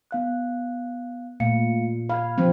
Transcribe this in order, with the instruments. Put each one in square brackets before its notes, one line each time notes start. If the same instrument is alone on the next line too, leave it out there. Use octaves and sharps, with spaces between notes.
[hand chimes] B3 F5 F#6
[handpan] A#2 [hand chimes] A3 F5 C#7
[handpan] F5 [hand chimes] B5 F6 G#6
[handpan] F3 C4